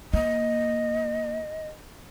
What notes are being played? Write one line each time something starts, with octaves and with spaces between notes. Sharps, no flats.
A#3 D#5